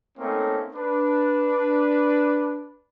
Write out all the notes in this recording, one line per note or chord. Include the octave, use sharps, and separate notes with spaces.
A3 A#3 C4 C#4 D#4 A4
D4 B4